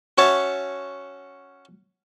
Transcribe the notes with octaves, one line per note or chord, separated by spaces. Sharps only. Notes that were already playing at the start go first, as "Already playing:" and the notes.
C#4 F#4 C#5 E5 A5